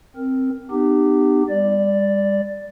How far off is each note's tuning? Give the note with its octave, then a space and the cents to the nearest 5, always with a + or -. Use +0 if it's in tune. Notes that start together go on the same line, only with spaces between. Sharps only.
C4 +0 A#4 +0
B3 +25 D#4 -35 G4 +0
G3 +35 D5 +0